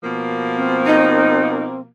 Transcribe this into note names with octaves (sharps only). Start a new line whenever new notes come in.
B2 F3 A#3
C4
D#4